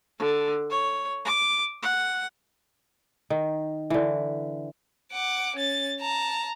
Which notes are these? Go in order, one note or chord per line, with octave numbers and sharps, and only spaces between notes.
D3
C#5
D6
F#5
D#3
D3 E3
F#5 D6
C#4 A6
A5 A#5